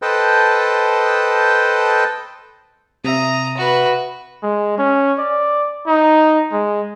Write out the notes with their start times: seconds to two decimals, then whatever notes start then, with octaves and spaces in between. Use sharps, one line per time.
0.02 A4 B4 C5 D#5 G5 A5
3.05 C3 E5 A#5 D#6
3.57 F#4 B4
4.43 G#3
4.78 C#4
5.19 D5
5.87 D#4
6.52 G#3